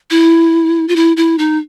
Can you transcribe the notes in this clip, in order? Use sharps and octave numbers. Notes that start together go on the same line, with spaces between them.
E4
F4
E4
E4
D#4